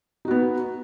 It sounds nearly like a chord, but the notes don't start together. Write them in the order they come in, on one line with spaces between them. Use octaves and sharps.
D#4 F#4 B3